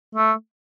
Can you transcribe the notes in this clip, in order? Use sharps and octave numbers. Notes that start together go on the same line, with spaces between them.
A3